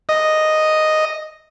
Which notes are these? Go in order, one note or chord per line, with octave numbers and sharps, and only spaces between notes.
D#5